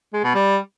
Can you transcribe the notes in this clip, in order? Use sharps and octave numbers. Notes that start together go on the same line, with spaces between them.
G#3
B2
G3